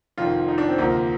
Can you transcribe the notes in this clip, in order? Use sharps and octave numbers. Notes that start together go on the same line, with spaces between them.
F1 F2 D#3 F4
D#4
D4
C4
D2 C3 F3 A#3